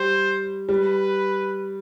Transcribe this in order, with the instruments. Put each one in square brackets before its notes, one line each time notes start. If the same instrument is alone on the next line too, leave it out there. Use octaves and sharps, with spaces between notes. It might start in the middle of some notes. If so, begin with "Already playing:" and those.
Already playing: [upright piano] G3 [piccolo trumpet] C5
[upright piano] G3 [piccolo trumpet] B4